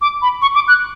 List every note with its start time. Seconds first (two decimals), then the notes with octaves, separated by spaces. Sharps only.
0.01 D6
0.22 B5
0.42 C#6
0.55 D6
0.68 F#6